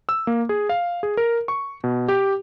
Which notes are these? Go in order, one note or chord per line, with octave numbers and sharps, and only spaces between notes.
E6
A#3
G#4
F5
G#4
A#4
C#6
B2
G4